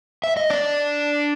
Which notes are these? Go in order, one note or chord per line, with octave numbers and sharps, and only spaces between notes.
E5
D#5
D4 D5